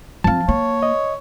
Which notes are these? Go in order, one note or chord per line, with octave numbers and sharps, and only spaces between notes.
F3 C4 F5 A5
A#3 C#5
D#5